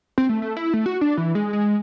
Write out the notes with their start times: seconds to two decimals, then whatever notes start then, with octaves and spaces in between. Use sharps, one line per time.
0.18 C4
0.29 A3
0.42 A3
0.57 E4
0.74 A3
0.86 F#4
1.01 D4
1.17 E3
1.35 G#3
1.53 G#3